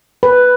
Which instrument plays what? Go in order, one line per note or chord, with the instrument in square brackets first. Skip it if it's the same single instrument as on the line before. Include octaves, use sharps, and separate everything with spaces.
[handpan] B4